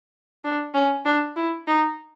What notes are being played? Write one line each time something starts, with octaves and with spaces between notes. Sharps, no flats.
D4
C#4
D4
E4
D#4